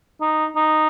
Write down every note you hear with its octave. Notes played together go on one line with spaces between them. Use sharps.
D#4
D#4